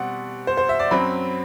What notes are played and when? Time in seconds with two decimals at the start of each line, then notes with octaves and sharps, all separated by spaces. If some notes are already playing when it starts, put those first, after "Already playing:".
Already playing: B2 G3 C4 F#5
0.47 C5
0.57 C5
0.69 E5
0.79 D5
0.91 F#2 F#3 C4 B5